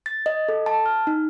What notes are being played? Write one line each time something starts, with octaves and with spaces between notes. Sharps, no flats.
A6
D#5
A4
A5
F6
D#4